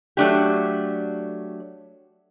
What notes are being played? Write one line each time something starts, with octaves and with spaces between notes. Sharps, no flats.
F#3 A3 D4 G4